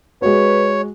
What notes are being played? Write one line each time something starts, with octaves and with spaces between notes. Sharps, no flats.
G#3 F#4 B4 C#5